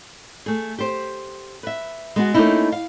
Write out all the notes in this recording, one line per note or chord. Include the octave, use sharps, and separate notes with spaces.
A3 G#4
G4 C5
B4 E5
G#3 B3 F#4
A3 A#3 C#4 D#4 E4
F5